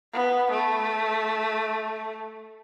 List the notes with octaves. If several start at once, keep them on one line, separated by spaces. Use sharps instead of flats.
B3
A3